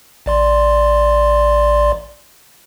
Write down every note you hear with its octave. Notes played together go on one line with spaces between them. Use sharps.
A1 D5 C6